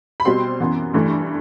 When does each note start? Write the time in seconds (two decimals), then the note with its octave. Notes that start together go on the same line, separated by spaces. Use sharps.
0.20 B5
0.25 B2 G3 C4 C6
0.60 F#2 E3 B3
0.94 G2 E3 A3